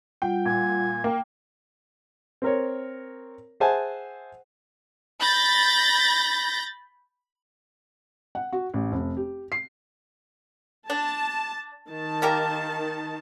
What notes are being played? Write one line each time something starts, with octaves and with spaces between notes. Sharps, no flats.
G3 F4 F#5 G5
A#2 G#6
A#3 G5
C4 A#4 C#5
G#4 C5 E5 F#5 G#5 A5
B5 G6 A6 A#6
F#5
F#4
A1
F1
G4
C7
D4 A5
D#3 A5
A#3 G4 A#4